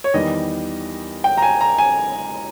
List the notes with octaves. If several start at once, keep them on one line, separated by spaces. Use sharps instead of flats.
C#5
E2 D#3 G3 D#5
G5
A#5
G#5
A#5
G#5